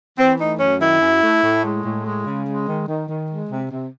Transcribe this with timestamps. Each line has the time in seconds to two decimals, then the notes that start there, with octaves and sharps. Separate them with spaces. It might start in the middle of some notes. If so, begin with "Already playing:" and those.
0.17 E3 C4
0.38 A3 D#4
0.58 F#2 C#4
0.80 D#3 E4
1.01 F#2
1.22 A3
1.42 A2
1.62 G#3
1.84 A2
2.04 G#3
2.25 C#3
2.47 G#3
2.67 D#3
2.87 D#3
3.09 D#3
3.30 G#3
3.50 C3
3.71 C3